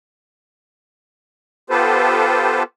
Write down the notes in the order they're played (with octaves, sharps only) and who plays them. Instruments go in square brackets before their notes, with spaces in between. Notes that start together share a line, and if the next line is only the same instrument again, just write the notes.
[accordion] B3 F4 G4 A4 B4 C5